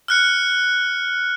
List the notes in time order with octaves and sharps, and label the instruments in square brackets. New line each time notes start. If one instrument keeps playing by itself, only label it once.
[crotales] F6 F#6 C#7